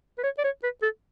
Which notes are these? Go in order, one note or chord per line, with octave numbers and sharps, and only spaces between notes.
B4
C#5
D5
C#5
B4
A4